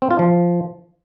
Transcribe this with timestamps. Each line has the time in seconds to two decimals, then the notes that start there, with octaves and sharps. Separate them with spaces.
0.02 C4
0.11 F4
0.19 F3